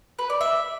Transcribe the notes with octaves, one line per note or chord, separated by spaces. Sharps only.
B4
D5
E5